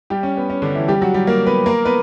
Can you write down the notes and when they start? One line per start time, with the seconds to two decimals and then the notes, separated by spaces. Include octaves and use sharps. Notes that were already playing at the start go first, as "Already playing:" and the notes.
0.10 G3 G4
0.23 C#4
0.37 B3
0.50 C#4
0.62 D3 D4
0.75 E3 E4
0.88 G3 G4
1.02 F#3 F#4
1.14 G3 G4
1.27 A#3 A#4
1.46 B3 B4
1.66 A#3 A#4
1.85 B3 B4